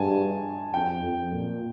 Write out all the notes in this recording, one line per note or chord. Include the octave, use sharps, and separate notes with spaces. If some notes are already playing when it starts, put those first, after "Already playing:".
Already playing: G2 G#5 A5
F2 G5
F2
A#2